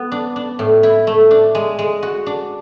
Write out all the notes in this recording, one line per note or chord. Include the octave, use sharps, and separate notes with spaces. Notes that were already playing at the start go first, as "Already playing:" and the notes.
Already playing: B3
D4
D4
A2
E4
A3
D4
G#3
G#3
F#4
D4